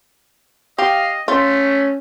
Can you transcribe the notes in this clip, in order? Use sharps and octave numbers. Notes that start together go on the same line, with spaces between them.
G4 D#5 F5
A3 C#4 F4